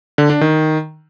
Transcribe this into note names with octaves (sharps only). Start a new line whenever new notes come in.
D3
D4
D#3